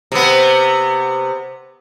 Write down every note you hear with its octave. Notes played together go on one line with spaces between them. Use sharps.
C3 B3